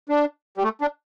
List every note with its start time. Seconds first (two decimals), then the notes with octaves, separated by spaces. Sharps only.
0.09 D4
0.57 G3
0.63 A3
0.81 D4